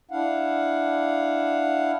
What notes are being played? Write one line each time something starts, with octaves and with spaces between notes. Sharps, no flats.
D4 E4 F5 F#5